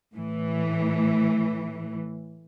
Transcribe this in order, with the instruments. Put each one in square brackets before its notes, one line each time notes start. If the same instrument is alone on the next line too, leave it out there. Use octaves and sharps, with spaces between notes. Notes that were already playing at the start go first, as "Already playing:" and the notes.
[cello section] A2 E3